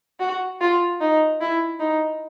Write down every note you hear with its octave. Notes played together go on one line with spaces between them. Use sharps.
F#4
F4
D#4
E4
D#4